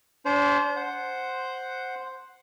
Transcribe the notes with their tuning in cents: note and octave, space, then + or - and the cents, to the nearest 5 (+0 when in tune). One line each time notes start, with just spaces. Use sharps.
D4 -40 C5 +0
C5 +0 F#5 +0